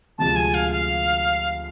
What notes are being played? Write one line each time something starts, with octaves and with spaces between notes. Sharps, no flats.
D2 C3 F3 G#3 A5
G#5
F5
F5